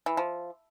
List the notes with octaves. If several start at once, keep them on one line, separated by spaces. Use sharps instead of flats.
E3
F3